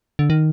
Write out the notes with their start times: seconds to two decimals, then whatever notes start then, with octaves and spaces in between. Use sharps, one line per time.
0.19 D3
0.30 D#3